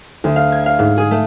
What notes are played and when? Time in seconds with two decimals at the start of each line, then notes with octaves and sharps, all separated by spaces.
0.24 D2
0.36 F5
0.52 G#6
0.66 F5
0.79 G#2
0.98 G#4
1.11 A3